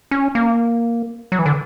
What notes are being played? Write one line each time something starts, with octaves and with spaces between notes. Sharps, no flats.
C#4
A#3
F#3
E3
D3